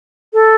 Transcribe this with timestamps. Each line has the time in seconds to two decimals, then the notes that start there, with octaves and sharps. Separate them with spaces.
0.33 A4